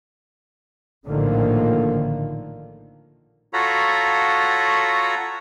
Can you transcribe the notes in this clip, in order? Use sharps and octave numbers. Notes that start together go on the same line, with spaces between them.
A#1 A2 D3 D#3 F3 A#3
F4 F#4 A4 C#5 A#5 B5